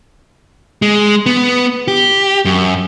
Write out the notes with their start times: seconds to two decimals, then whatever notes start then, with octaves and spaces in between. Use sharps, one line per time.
0.82 G#3
1.26 B3
1.88 G4
2.45 F#2